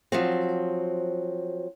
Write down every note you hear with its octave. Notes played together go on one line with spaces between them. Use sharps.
F3 F#3 C4